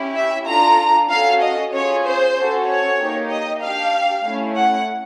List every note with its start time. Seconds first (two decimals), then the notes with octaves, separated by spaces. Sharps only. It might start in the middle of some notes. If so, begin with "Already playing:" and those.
Already playing: C#4 E4 G4
0.15 E5
0.46 D4 F4 A4 A#5
1.10 C#4 F#4 A4 F5
1.41 D#5
1.72 C#4 F4 G#4 C#5
2.05 C5
2.36 C#4 F#4 A4
2.67 C#5
2.99 A#3 D#4 G4
3.30 D#5
3.62 D4 G4 F5
4.25 A3 C#4 E4
4.56 F#5